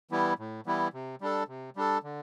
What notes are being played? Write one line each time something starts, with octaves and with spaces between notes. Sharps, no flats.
E3 G3 B3 E4
A2
E3 G3 B3 E4
C3
G3 D4 A4
C3
G3 D4 A4
D3